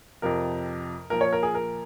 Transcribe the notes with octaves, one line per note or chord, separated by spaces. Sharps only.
F2 C3 F3 A#4
A#2 F3 A#4
C#5
A#4
G#4
A#4